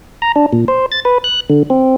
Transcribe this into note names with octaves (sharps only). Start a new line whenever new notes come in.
A#5
D4
A#2
C5
A6
B4
F#6
D3
C4